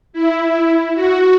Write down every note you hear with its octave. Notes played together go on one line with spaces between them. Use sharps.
E4
F#4